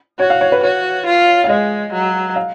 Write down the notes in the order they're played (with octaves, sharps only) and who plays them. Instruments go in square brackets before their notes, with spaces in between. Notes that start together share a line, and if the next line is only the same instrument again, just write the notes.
[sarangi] F#4 [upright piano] C#5
[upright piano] F5
C#5
B4
[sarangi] F#4 [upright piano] C#5
[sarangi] F4
[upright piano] F5
[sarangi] G#3 [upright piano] D#5
[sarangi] F#3
[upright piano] F5